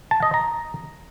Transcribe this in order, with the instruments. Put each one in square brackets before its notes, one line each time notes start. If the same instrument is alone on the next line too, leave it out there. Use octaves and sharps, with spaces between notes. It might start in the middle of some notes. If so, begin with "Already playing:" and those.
[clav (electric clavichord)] A5
D#5
A#5